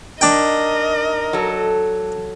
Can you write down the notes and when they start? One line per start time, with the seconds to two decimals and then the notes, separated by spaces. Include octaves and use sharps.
0.21 D4 D#4 A#4 D#5 G5
1.33 F#3 A4